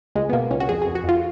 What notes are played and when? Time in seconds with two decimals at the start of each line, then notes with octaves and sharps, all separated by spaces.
0.15 C#2 G#3
0.29 B3
0.33 B2 A#3
0.51 C#2 C#4
0.60 F#4
0.69 F2 G#4
0.82 G#4
0.87 F2
0.95 F#4
1.03 F2
1.09 F4